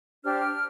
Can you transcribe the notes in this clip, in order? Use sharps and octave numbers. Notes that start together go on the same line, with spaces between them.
D4 G4 C5 F6